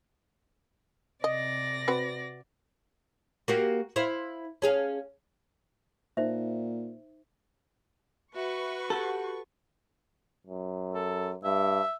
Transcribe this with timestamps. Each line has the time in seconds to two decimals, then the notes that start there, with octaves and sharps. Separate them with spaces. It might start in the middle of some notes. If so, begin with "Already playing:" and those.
1.24 C3 D5 D#5 A#6
1.88 C4 F#4 B4
3.48 A#3 F#4 G4
3.96 E4 C5 F5
4.62 C#4 G#4 F5
6.17 A#2 D#4 C5 E5
8.35 F#4 B4 E5 C#6
8.90 G4 A4 F#5
10.47 F#2
10.94 A4
11.44 G2 E5